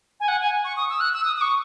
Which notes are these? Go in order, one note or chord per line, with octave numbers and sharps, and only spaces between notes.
G#5
F#5
G#5
C#6
D#6
E6
F#6
E6
D#6
D#6
C#6